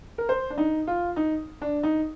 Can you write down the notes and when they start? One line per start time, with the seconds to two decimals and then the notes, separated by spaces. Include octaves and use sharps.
0.18 A#4
0.29 C5
0.50 D4
0.58 D#4
0.87 F4
1.16 D#4
1.62 D4
1.83 D#4